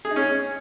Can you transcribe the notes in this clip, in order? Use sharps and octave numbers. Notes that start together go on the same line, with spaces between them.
G#4
D#4
C#4